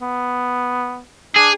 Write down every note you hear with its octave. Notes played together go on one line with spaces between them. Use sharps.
B3
D4 G#4